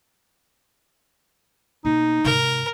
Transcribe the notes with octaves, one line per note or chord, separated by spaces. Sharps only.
B2 A#3 D#4
G#2 C3 A#4